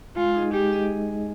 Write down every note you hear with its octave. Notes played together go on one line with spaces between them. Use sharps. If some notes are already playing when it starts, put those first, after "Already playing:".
G#3 F4
D#4 G#4 D#5
G#3 G4
D#4 G#4 D#5